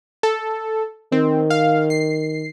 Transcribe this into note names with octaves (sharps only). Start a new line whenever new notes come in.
A4
D#3 C4
F5
C7